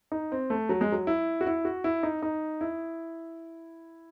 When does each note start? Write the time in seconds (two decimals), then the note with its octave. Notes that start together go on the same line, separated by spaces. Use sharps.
0.12 D#4
0.32 C4
0.50 A3
0.69 F#3
0.81 G#3
0.92 F#3
1.07 E4
1.41 F#4
1.47 E4
1.65 F#4
1.84 E4
2.03 D#4
2.22 D#4
2.61 E4